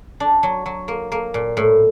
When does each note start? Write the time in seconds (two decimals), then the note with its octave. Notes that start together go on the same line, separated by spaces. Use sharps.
0.20 D4
0.43 F#3
0.66 F#3
0.88 A#3
1.12 A#3
1.34 A#2
1.57 A2